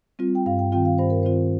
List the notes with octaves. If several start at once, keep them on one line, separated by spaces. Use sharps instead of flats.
G3 C4 F4
G5
G2 F5
G5
D#3 C4 F4 G5
F5
G2 C5
A#4
D#3 C4 F4 C5